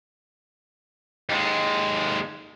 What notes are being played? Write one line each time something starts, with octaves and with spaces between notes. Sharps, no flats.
D#2 G#3